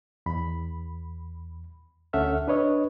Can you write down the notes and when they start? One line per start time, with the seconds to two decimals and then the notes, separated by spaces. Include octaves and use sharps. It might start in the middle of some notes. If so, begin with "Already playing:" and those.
0.26 E2 B5
2.13 D2 C#4 A4 E5 F#5 F6
2.48 D4 B4 C#5 D#5